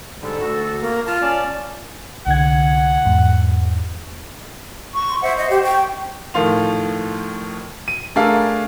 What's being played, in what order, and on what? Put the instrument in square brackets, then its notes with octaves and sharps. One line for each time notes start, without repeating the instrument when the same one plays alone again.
[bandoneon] G#2 D3 G3 [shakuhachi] A4
[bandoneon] D2 F#4
[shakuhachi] A#3
[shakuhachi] F4 [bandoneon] A5
[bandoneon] C#4 D5 A5
[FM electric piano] C2 D3 G#6 [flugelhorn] F#5
[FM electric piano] E2 G#2
[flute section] C#6
[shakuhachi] C6
[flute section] C5 F#5 [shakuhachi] E5
[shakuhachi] D#5
[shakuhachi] G4 [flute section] C5
[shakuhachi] G5 [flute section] C#6
[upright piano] A2 D#3 F3 F4 C6 F7
D#7
A3 D4 G#4 A#4 E5 F5